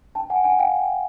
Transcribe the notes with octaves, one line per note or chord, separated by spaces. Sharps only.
G5 A5
F#5 G#5
F#5 G#5
F5 G5